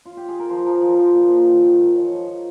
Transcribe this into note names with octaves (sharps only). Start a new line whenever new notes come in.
F4
G4
G#4
A#4
F3 C5
F3 A#4
F3
F3 A#4 C5
A#2
F3
D#3
D#3
G#2
F3 C#5
F3
F3